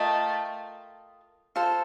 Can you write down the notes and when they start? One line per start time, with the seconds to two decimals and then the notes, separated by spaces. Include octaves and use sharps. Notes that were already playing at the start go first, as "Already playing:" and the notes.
Already playing: A3 F4 A#4 D#5 G5
1.56 F4 A4 C5